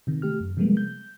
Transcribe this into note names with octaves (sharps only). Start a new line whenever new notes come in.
C3 D#3
A3 G4 F6
F#2
C3 F3 G3 G#3 A#3 B3
G6